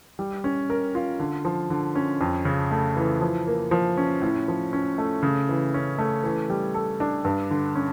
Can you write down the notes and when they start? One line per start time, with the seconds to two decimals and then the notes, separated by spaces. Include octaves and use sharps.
0.19 G3
0.44 C#4
0.70 A#4
0.95 F4
1.19 D3
1.45 F3
1.70 D3
1.95 C#4
2.21 F2
2.45 C#3
2.71 A3
2.97 E3
3.21 F3
3.47 A#3
3.71 F3
3.97 C#4
4.22 A2
4.48 F3
4.73 C#4
4.98 A3
5.23 C#3
5.49 E3
5.74 C#4
5.98 A3
6.24 E3
6.50 G3
6.74 A4
7.00 D4
7.25 G2
7.51 D3
7.75 C#4